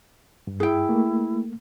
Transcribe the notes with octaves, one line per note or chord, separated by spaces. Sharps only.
G2
E4 G#4 G5
A3 A#3